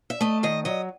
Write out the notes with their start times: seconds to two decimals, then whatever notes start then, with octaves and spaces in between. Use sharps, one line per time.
0.10 E5
0.21 A3 D#5
0.43 D#3 D#5
0.65 F#3 D#5